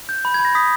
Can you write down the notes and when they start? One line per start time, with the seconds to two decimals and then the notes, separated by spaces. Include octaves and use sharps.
0.09 G6
0.25 B5
0.34 G#6
0.40 B5
0.45 A#6
0.55 D#6 B6